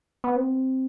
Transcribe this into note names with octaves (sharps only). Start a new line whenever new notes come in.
B3
C4